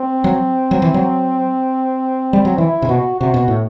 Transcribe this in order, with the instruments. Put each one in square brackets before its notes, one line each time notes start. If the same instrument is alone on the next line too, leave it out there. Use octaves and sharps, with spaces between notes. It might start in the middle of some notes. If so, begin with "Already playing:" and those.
Already playing: [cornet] C4
[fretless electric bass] F#3
F#3
E3
F#3
G3
F#3
[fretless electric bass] E3 [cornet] E4
[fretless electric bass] C3
[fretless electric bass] B2 [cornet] F#4
[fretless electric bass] C3 [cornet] F#4
[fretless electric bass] B2
A2